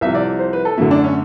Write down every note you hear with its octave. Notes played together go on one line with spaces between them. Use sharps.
C2 C3 F3 E5
D5
C5
B4
A4
F#2 D3 F#3 A3 E4
D4
C#4